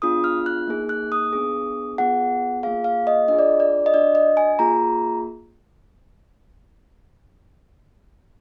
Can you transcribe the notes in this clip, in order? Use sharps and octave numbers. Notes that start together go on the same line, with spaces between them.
B3 D4 F4 G#4 D#6
F6
F#6
A#3 D#4 G#4
F#6
D#6
B3 D4 G#4
B3 F4 G#4 F#5
A#3 F4 G#4 F5
F5
D#5
D4 F4 G#4 D#5
D5
D5
D#5
D4 F#4 D5
D#5
G#5
A#3 F4 G#4 A#5